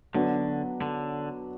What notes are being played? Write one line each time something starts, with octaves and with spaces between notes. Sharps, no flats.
D3 F#3 B3 D4 F#4 B4
D3